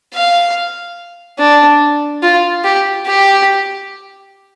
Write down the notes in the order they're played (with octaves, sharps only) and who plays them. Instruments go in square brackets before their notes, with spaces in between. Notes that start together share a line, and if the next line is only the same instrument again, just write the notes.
[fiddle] F5
D4
F4
G4
G4